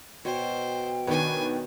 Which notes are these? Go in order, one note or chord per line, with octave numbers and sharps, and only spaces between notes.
B2 C5 C#5 G5
D#3 B3 D4 C#5 G#5 B5